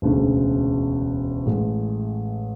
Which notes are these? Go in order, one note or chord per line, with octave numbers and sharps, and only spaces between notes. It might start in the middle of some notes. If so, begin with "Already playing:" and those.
E1 D2 C#3
A1 A2 G#3